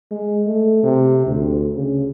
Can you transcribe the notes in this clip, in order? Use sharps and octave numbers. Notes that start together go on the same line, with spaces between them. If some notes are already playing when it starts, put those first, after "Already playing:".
G#3
A3
C3
D2
C#3